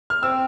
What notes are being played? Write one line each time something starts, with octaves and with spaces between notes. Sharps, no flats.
F6
C4 E6